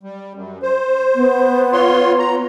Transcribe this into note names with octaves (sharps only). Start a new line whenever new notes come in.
G3
F#2
C5
B3
F4 C#5 C6
A#5